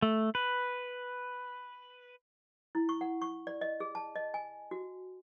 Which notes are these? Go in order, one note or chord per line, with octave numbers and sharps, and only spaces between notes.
A3
B4
E4
C#6
F#5
C#6
D5
D#5
G#4
A5
D#5
G#5
F#4